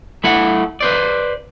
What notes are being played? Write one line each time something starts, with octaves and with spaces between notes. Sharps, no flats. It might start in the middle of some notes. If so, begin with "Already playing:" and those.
A3 E4 F#5
B4 C5 D5